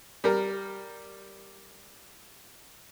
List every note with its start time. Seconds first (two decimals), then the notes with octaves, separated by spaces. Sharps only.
0.24 G3 A#4